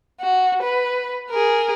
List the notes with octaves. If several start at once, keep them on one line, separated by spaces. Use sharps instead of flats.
F#4
B4
G#4 A#4